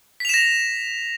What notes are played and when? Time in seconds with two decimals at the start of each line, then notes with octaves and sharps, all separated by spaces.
0.20 B6
0.25 F7
0.29 E7
0.34 A#6